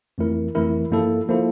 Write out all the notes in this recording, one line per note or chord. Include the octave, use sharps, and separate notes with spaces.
F2 E3 A3 E4 A#4
F2 E3 A3 E4 A#4
G2 F3 A#3 E4 A4
F3 A#3 E4 A4